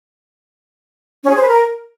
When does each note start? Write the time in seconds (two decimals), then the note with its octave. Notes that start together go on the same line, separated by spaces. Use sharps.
1.24 C#4
1.30 G#4
1.36 C5
1.42 B4
1.48 A#4